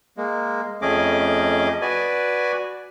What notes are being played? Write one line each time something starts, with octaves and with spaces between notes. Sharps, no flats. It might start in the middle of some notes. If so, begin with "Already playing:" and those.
G#3 A#3
F2 A3 C#4 G#4 D#5 D6
F#4 B4 D5 G#5